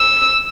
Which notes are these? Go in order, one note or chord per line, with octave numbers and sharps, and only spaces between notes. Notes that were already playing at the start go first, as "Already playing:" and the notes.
Already playing: E6